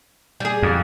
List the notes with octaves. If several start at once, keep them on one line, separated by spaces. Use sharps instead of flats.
G3 G#4
F2